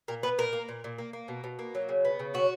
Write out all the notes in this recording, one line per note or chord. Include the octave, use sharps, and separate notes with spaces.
A#2 A#4
B3 B4
A#2 A#4
A#3
A#2
A#2
A#3
A#3
B2
B2
A#3
F#3
C#3
B3
C#3
F#3 F#4